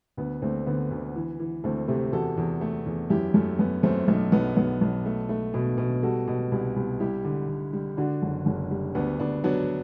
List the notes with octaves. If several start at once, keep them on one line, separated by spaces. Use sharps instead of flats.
D2 B3
D2 A3 C4
D3 B3
D2
E3
E3
D2 A3 C4
C3 A3 C4
E2 F#4 A4
E2
A3
E2
F#2 E4 G4
F#2 A3
F#2 B3
F#2 A3 C4
B1 A3
B1 B3
B1 B3
B1
A3
A3
B2
B2
G3 F#4 A4
B2
C2
C2
G3 E4 G4
D3
D3
G3
D3 D4 F#4
F#1
F#1
G3
D2 B3 D4
D2 B3 D4
F#3 B3 D4